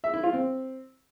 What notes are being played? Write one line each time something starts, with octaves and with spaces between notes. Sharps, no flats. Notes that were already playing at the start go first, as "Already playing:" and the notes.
E5
E4
F4
C4